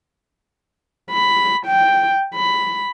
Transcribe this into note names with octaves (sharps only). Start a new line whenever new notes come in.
B5
G5
B5